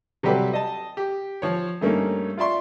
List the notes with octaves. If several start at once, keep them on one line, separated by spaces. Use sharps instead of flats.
C3 F#3 G3 G4 A4 B4
D#5 A5
G4
F3 C#5
G2 A3 A#3 C#4 D#4
F4 D5 E5 C6 C#6